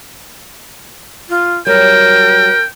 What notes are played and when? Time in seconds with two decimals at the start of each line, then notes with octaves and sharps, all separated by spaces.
1.29 F4
1.67 F#3 G3 A#4 G5